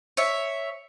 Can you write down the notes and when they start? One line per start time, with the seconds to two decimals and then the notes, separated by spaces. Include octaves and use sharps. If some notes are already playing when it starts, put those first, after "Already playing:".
0.17 C#5 E5